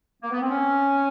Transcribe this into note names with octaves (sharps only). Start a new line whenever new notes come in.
A#3
B3
C4
C#4